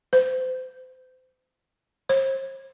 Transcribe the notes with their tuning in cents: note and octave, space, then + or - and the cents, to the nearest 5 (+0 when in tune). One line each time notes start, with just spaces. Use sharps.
C5 -30
C5 +40